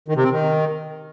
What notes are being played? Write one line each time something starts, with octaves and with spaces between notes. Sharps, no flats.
D#3
C3
C4
D#3